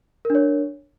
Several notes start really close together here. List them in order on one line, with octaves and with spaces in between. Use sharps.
A#4 D4 C#5